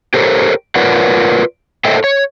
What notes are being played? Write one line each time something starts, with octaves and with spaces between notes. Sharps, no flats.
G4 A4 A#4 C5 C#5
F4 A#4 B4 C#5 D5 F#5
A4 C5 C#5 D#5 E5 G5
C#5